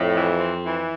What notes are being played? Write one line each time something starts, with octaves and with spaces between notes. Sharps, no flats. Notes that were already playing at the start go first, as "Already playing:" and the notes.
Already playing: F2 A2
E3
C4
E3